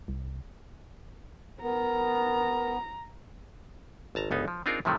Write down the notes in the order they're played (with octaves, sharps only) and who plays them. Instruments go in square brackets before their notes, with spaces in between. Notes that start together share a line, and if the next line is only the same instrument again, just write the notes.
[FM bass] C2
[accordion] B3 [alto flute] A#4 [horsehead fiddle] A#5
[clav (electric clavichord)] G#1 A5 A#5
G1 C#2 B3 D#4
F3
C4 D4 D#4 F4 G#4 A#4
A2 C3 D#3 F3 F#3 A3